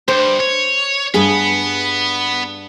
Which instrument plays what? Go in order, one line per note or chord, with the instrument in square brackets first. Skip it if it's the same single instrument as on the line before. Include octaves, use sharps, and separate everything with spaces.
[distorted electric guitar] G2 [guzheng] C5
[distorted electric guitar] C#5
[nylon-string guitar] G2 G#4 [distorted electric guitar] B3